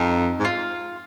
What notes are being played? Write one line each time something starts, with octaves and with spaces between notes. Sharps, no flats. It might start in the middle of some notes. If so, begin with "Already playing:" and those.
Already playing: F2 D#4
G#2
F4